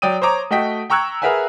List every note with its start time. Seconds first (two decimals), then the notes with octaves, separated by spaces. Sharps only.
0.02 F#3 D5 G5 D#6 D#7
0.22 C5 C#5 A#5 D6
0.51 A3 F#4 D#5 G5 B6
0.90 G5 A#5 C#6 E6 F#6 G#6
1.22 G#4 A#4 B4 E5 F#5 G#5